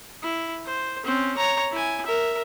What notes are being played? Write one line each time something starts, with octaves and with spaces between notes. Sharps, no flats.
E4
C5
C4 C#4
C#5 A#5
E4 G#5
A#4 E5